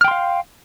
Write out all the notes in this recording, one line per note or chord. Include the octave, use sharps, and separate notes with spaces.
F5 G5 C6 F6